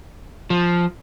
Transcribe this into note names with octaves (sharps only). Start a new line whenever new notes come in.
F3